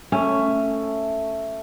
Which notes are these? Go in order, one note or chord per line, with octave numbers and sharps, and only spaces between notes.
A3 C#4 E5